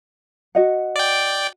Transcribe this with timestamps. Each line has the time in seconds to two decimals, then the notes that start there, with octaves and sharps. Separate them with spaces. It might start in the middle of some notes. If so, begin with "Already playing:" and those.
0.55 F#4 D#5 F#5
0.96 D5 G5